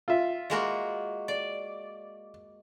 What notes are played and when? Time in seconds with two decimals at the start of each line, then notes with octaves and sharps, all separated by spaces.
0.08 F4 E5
0.50 G#3 A#3 F#4
1.28 D5